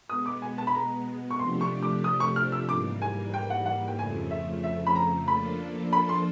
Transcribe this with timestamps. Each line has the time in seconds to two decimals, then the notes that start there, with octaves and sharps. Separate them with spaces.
0.10 B2 G#3 B3 D#6
0.26 D6
0.42 G#5
0.58 A5
0.67 B5
0.75 A#5
1.30 C#6
1.39 C3 F3 A3 D4 G4 C6
1.61 C#6
1.83 D6
2.04 D#6
2.20 C#6
2.36 F6
2.52 E6
2.68 G#2 E3 G3 A#3 D6
3.02 G#5
3.34 G5
3.50 F#5
3.66 F#5
3.88 G5
3.98 F2 C#3 F3 A3 G#5
4.31 E5
4.64 E5
4.87 B5
4.95 A#5
5.28 F3 A#3 D4 F4 A4 B5
5.93 B5
6.09 C6